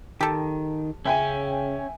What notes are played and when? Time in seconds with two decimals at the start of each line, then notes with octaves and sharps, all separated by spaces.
0.21 D#3 G4 A4
1.06 C#3 C#4 E5 G5 G#5